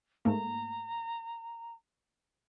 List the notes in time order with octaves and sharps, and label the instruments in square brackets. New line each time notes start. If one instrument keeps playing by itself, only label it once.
[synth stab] G#2 A3 A#3 [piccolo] A#5